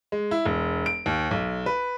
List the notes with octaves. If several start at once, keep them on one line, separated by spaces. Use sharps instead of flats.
G#3
E4
E1
D7
D#2
B1
B4